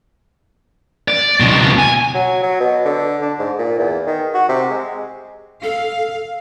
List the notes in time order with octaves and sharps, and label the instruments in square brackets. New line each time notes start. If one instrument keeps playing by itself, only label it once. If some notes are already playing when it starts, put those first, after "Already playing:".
[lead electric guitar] D5
C#2 B2
G#5
[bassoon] F#3
F#3
B2
D3
D4
G#2
A#2
E2
D#3
F#4
C3
G#3
[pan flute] A4 [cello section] F5